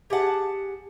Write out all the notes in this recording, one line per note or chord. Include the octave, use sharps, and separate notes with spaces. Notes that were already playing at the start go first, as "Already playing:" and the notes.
G4 G#4 F#5 A5